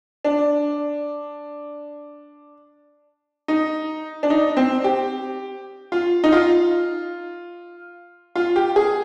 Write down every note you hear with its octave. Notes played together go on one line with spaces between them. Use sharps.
D4
D#4
D4
D#4
C4
G4
F4
D#4
F4
F4
G4
G#4